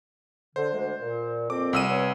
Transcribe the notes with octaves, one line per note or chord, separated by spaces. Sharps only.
D3 C5
D2 G#3
A#2
F2 A#2 C4 D6
C2 E6 D#7
B3 C#5